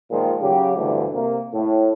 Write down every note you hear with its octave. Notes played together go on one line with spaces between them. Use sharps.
A#2 D#3 F3 G#3
C#3 F#3 G4
D2 G2 C3 E3
C3 A#3
A2